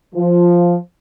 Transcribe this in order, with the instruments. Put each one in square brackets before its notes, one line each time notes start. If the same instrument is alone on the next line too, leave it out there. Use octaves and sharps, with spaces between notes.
[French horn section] F3